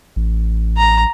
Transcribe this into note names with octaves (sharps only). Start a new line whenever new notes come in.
A1
A#5